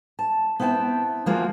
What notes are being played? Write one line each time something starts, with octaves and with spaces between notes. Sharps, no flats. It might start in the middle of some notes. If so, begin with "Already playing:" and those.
A5
B3 C4 E4 F#5 G5 A5
D2 F3 G#3 A#3 F4 F#4